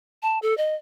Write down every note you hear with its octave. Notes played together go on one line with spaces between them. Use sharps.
A5
A4
D#5